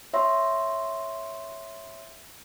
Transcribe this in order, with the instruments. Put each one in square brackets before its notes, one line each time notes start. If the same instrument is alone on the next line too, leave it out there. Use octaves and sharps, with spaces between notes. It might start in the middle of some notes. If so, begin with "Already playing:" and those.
[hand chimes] C#5 E5 C6